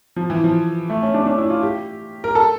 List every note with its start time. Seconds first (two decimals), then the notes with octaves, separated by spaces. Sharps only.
0.16 F3
0.30 E3
0.44 F3
0.90 A3
1.02 C#4
1.14 D4
1.22 C#4
1.26 D4
1.38 E4
1.50 F4
1.63 G4
2.24 A#4
2.35 A4